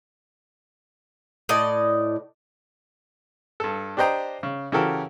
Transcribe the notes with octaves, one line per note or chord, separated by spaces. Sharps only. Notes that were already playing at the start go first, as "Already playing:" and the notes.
A2 D5 D#5
G2 A4
D4 G4 C5 D#5 G5 A#5
C#3
C#3 E3 F#4 G4 A4 A#4